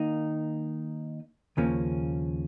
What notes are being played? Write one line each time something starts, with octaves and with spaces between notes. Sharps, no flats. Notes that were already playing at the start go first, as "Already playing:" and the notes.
Already playing: D#3 A#3 D#4
D#2 C#3 F3 A#3 C#4